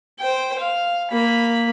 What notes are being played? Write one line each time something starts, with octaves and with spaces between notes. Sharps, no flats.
C5 G5
F5
A#3 B5